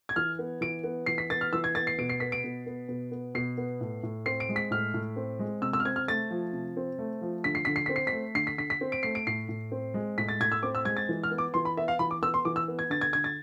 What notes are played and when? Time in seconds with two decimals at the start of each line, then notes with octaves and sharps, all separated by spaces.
0.09 G#6
0.16 E3 F6
0.39 B3
0.61 E3 D7
0.84 B3
1.06 E3 C7
1.18 B6
1.30 B3 A6
1.41 F6
1.53 E3 E6
1.64 G#6
1.75 B3 A6
1.87 C7
1.98 B2 D7
2.09 C7
2.20 B3 B6
2.32 D7
2.44 B2
2.66 B3
2.89 B2
3.12 B3
3.35 B2 C7
3.58 B3
3.81 A2
4.03 A2
4.26 C4 C7
4.40 D7
4.49 G#3
4.56 B6
4.71 A2 F6
4.94 A2
5.16 C4
5.39 G#3
5.62 C3 E6
5.73 E6
5.80 F6
5.85 C4 G#6
5.96 F6
6.08 A3 A6
6.30 F3
6.53 C3
6.77 C4
6.99 A3
7.21 F3
7.44 D3 B6
7.55 C7
7.65 D3 B6
7.76 C7
7.86 C4 B6
7.96 C7
8.07 B6
8.12 A3
8.35 D3 C7
8.47 B6
8.58 D3 B6
8.70 B6
8.81 C4
8.92 D7
9.03 A3 C7
9.15 D7
9.27 A2 C7
9.49 A2
9.72 C4
9.94 G#3
10.18 A2 B6
10.29 A6
10.40 A2 G#6
10.52 E6
10.63 C4 D6
10.75 E6
10.85 G#3 G#6
10.97 A6
11.09 E3
11.23 F6
11.31 B3
11.38 D6
11.54 E3 C6
11.65 B5
11.77 B3 E5
11.88 F5
11.99 E3 B5
12.11 D6
12.22 B3 E6
12.34 C6
12.45 E3 D6
12.56 E6
12.68 B3
12.79 G#6
12.90 D3 A6
13.01 G#6
13.13 D3 G#6
13.24 A6